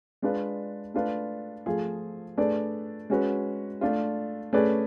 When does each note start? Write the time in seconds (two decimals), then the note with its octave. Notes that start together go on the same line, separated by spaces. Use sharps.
0.22 G#3 D4 F4 B4 D5
0.94 A3 D4 F4 B4
1.66 F3 A3 F4 G#4
2.37 A3 D4 G#4 B4 D5
3.10 G#3 C#4 F#4 B4
3.81 A3 D4 F4
4.53 A3 C#4 G#4 B4 D5